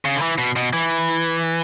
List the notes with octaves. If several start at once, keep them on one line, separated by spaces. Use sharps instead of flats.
C#3
D3
E3
B2
B2
E3